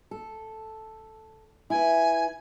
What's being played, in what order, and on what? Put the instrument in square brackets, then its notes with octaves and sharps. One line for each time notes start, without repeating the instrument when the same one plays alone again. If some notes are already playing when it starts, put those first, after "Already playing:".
[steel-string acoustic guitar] A4
[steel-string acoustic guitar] E4 B4 [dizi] G#5